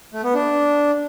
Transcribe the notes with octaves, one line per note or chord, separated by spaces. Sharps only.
A3
B3
D4